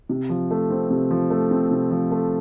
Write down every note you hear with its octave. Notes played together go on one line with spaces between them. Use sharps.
C3
F3
A3
C4
C3
F3
A3
C4
C3
F3
A3